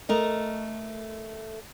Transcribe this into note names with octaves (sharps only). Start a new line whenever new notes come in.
A3 A#4 D#5